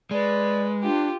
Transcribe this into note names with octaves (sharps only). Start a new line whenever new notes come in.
G#3 B4 D5
D4 F4 G4